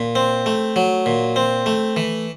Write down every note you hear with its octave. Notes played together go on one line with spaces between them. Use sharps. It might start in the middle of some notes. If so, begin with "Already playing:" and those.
Already playing: A#2
C4
A3
F#3
A#2
C4
A3
E3